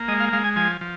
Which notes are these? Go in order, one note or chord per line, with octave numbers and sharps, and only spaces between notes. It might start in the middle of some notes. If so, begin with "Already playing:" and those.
Already playing: A#3
G#3 D#5
F5
G#3 F5
G#5
F3 G#5
F3